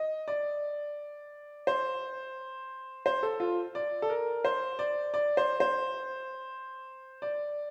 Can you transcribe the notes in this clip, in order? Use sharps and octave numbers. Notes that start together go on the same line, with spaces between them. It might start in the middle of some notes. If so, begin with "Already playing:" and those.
Already playing: D#5
D5
C5
C5
A4
F4
D5
A4
A#4
C5
D5
D5
C5
C5
D5